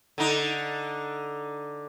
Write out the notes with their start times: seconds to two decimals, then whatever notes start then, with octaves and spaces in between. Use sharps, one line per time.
0.18 D3 D#4